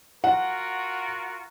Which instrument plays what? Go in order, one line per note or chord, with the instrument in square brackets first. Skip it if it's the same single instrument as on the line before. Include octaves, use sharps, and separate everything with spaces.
[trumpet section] F4 F#4 A#4 [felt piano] F#5